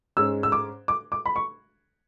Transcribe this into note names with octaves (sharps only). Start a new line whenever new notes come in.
G#2 G#3 C#4 E6
E6
D6
D6
D6
B5
C#6